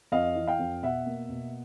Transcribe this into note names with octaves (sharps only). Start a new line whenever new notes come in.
F2 D#5 F5
E3
F5 G5
F2
B2 E5 F#5
A#3
B2